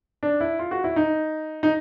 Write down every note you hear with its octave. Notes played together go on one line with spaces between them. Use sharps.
D4
E4
F4
F#4
E4
D#4
D#4